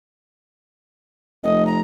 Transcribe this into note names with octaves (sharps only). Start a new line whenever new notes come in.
F1 D#5
A#5